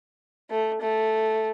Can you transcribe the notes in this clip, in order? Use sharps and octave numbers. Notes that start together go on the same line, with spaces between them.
A3
A3